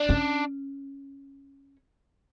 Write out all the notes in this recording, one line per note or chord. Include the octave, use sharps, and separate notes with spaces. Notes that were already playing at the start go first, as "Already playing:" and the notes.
Already playing: D4
C#4